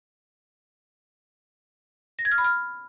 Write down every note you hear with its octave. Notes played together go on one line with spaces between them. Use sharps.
A#6
G#6
F6
B5
F6